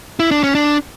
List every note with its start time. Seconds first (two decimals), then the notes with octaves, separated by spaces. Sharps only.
0.20 E4
0.31 D4
0.44 C#4
0.55 D4